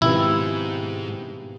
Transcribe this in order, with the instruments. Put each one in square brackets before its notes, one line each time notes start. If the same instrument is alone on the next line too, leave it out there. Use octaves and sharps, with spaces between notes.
[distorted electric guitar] G#2 [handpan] B2 G4 B4 [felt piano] D#3 F3 C4 [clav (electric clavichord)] E4